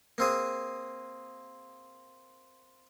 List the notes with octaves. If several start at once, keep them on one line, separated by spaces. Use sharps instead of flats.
A#3 C4 G#4